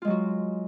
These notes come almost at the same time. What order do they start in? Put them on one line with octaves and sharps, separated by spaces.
F4 G#3 F#3 F#4